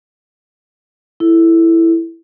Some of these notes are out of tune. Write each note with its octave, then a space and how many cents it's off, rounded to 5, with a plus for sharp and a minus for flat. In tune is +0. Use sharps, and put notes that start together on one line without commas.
E4 +5 A4 +0